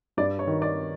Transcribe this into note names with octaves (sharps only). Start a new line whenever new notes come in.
G2 D5
C#5
D#3
D5